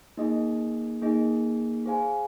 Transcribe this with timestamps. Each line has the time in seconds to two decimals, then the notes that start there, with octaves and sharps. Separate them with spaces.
0.17 A#3 D#4 G#4 D#5
1.02 A#3 D#4 G#4 D#5
1.86 G#4 C5 F5 G#5